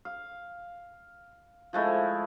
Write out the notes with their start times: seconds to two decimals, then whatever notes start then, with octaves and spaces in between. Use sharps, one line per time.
0.05 F5
1.73 F3 G#3 A3 E4